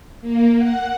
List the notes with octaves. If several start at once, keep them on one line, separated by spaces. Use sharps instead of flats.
A#3
F#5